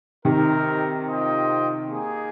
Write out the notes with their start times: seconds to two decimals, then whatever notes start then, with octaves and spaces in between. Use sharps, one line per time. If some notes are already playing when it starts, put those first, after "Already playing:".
0.25 C3 D#3 C4 D#4 A#4
1.06 F4 C5 D#5 G5
1.86 A#3 D#4 G#4